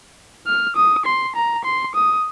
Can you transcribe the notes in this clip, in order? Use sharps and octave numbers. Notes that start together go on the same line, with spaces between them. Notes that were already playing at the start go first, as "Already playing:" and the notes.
F6
D#6
C6
A#5
C6
D#6